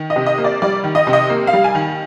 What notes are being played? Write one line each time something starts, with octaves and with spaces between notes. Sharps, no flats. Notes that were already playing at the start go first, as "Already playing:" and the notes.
Already playing: D#3
D#5
C3
D#5
A#3
D5
G3 D5
D#3
D#5
C3
D#5
A#3
F5
G3
G#5
D#3